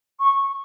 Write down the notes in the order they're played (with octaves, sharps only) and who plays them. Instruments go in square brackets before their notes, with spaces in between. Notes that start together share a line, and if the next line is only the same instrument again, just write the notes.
[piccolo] C#6